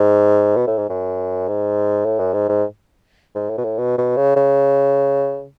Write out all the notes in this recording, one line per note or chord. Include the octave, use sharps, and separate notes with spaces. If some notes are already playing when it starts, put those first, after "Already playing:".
Already playing: G#2
B2
A2
G#2
F#2
G#2
A2
F#2
G#2
G#2
G#2
A2
B2
A2
B2
B2
C#3
C#3